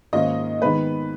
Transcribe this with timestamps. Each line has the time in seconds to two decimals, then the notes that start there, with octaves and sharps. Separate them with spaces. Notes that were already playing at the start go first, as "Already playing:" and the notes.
0.13 G#2 D#3 A#3 C#4 F4 D#5
0.61 D#3 G#3 B3 D#4 B4